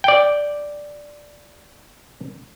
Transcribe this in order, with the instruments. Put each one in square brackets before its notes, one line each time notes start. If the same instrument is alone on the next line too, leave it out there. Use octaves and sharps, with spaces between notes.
[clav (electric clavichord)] D5 G5